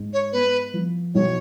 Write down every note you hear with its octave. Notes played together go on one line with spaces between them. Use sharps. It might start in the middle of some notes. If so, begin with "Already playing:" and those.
Already playing: G#2
C#5
B3 B4
F3
B1 C#5